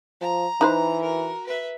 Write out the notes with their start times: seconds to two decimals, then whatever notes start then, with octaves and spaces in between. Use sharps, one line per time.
0.21 F3 A#5
0.61 E3 D#4 B4 C5
1.01 F#4 A#4
1.47 B4 E5